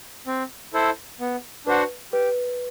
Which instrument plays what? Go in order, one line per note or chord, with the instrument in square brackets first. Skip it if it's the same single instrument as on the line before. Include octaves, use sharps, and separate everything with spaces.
[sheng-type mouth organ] C4
E4 A4 C5
B3
[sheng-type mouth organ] D4 F#4 C5 F#5 [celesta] B4
[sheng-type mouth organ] G4 [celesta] B4